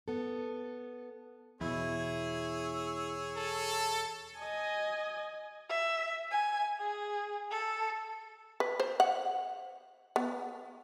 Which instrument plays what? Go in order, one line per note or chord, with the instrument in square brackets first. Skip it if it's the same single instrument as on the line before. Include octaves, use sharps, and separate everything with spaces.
[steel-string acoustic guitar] B3 A4
[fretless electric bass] E2 B2 [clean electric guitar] E4 [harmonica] G#4 C#5 E6
[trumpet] A4
[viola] D#5 G#5
[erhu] E5
G#5
G#4
A4
[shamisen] B4
C5
F#5
B3